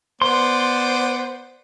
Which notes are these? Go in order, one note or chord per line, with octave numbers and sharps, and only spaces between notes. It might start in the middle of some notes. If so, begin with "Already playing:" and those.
B3 C5 D5 C6